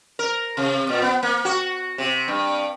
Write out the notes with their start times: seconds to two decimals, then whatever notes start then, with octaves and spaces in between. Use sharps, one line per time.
0.19 A#4
0.57 C3
0.89 A#2
1.02 B3
1.23 A#3
1.45 F#4
1.98 C3
2.28 G2